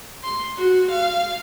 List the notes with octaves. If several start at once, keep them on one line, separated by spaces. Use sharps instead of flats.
C6
F#4
F5